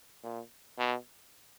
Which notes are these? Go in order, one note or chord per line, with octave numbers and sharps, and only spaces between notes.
A#2
B2